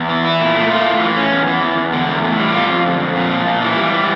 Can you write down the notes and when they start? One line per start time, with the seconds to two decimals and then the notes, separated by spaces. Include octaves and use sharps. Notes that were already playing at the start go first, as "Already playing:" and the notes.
Already playing: E2
0.09 E3
0.25 E4
0.40 A#2
0.56 A3
0.71 F4
0.86 A2
1.01 E3
1.17 C#4
1.32 E2
1.47 E3
1.63 E2
1.78 E2
1.93 D3
2.08 E2
2.24 A2
2.39 G3
2.54 F4
2.70 F2
2.86 D3
3.00 F2
3.15 A#2
3.31 F3
3.47 A#2
3.62 E3
3.77 G3
3.92 E3